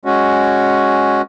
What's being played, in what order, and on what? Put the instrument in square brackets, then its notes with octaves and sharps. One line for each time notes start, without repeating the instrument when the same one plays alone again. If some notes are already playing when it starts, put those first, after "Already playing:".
[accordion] G#3 C#4 F#4